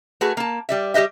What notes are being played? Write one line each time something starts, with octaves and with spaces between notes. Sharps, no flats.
A3 F#4 G#4 B4
A#3 A5
G3 D5 E5
G3 G4 B4 D#5 E5